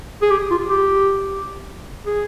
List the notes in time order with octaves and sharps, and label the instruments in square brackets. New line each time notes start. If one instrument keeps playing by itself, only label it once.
[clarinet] G#4
G4
F4
G4
G#4